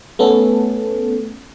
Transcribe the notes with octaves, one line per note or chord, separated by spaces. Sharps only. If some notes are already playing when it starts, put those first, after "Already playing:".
A3 B3 C#4 A4